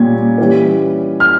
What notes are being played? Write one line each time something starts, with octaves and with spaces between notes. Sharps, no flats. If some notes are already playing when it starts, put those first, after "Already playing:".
Already playing: A#2 G3 C#4 G#6
E3 G3 C#4
F6